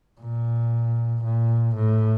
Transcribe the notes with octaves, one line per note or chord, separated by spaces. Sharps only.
A#2
A#2
A2